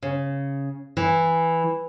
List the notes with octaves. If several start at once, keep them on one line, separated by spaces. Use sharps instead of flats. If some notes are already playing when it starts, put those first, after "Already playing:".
C#3
E3